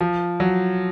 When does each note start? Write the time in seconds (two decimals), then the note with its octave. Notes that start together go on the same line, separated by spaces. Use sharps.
0.01 F3
0.40 F#3